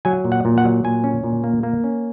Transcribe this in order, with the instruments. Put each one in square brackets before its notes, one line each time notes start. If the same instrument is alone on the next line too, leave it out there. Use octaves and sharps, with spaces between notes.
[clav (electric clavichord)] F#3 G#5
A#2
F#5
A#2
F#5
F#3
A#2 G#5
C#4
A#2
A#3
A#3
C#4